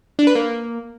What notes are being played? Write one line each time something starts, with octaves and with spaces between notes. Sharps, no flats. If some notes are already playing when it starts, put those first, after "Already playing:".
D4
B4
A#3